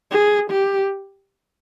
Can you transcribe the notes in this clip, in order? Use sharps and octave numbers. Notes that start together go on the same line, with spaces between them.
G#4
G4